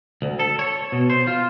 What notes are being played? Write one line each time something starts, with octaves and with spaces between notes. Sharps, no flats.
D2
A4
C#5
B2
C5
F4